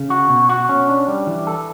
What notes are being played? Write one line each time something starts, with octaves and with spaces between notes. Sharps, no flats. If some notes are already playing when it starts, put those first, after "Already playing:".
Already playing: C#3
F#4
B2
F#4
C#4
D4
G3
E3
A4